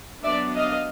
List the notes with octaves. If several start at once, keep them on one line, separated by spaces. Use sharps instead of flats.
F#3 B3 D4 D5 E5
D#5 F5